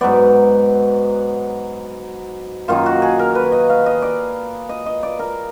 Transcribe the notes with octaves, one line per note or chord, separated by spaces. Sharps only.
G#2 F#3 B3 D5
F#2 D#3 A#3 D#4 F4
F#4
G#4
A#4
B4
D#5
F5
D#5
D5
D#5
D#5
D5
A#4